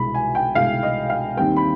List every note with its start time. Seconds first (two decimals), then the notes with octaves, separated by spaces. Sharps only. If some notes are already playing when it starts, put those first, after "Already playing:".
Already playing: C2 B2 G#3 B5
0.15 G#5
0.35 G5
0.55 C2 B2 G#3 F5
0.83 D#5
1.10 F5
1.37 D#2 D#3 G3 C4 G5
1.56 B5